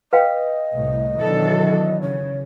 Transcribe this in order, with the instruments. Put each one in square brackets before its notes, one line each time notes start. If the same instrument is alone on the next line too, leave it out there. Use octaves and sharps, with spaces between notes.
[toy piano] B4 F5 G5 [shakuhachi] D#5
[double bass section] C2 A2
[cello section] B2 D4 A4 [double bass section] D#3 E3 F#3
[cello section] C#3 [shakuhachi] C#5